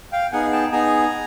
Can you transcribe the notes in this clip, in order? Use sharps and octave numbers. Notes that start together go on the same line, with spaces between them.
F5 G5
B3 D#4 G#4 F#5 G#5
G5 A5
B3 D#4 G#4 G#5 A#5